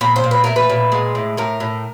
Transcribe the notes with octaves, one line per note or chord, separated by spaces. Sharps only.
A#2 B4
C5
A#2
B4
A3 A#4
B4
A#2
G#3
A2
A2 A#4
A2